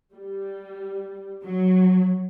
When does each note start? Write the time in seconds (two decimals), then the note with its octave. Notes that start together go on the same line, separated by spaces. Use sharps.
0.13 G3
1.44 F#3